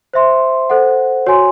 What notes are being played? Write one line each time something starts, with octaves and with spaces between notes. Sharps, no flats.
C5 E5 C6
A4 C5 F#5
F#4 C#5 G#5 C6